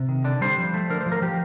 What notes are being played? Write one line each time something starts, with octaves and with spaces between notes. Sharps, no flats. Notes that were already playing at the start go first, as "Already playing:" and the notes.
Already playing: C3
D#3
D3 D4
G3 C5
F3
A3
D3 A#4
C5
F3
A#4
F3 G4